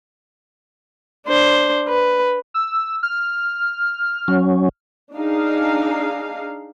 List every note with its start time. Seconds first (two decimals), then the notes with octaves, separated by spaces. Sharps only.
1.27 D4 C5
1.88 B4
2.54 E6
3.03 F6
4.28 F#3 C#4
5.15 D4 D#4 G#4 F5